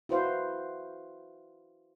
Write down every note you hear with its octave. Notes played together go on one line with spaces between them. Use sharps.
E4 F#4 B4 C5 F5